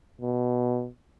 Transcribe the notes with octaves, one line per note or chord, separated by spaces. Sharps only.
B2